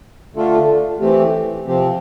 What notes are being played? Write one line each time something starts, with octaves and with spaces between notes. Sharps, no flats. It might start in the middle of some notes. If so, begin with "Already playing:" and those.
D3 A3 D4 F4 A4
E3 A3 C4 G4
C3 F3 C4 G4